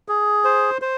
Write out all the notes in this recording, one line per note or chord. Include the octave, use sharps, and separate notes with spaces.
G#4
C5
C5